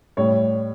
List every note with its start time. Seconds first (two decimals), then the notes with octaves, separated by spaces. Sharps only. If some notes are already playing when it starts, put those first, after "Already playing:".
0.17 A2 G3 C#5